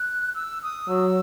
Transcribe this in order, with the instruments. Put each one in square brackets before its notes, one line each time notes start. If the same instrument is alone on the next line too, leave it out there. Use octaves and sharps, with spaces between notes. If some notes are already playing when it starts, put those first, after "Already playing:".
Already playing: [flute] F#6
E6
D#6
[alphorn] F#3 [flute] E6